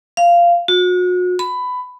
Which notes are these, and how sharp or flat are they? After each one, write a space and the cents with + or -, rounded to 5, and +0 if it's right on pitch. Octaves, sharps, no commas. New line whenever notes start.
F5 -15
F#4 -40
B5 +15